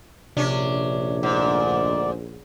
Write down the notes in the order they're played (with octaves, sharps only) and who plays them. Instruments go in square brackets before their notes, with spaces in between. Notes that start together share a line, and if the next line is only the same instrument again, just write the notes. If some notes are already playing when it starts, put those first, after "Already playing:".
[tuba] A#1 [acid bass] C3 [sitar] C#4 D4
[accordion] D2 D5 [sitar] G#2